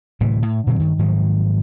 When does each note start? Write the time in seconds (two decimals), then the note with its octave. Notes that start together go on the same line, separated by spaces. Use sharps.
0.20 D1 A2 C3 E3
0.42 A2
0.67 A#2 D3 F#3 C4
0.79 G2 D#3
0.99 G#2 D#3 F3 F#3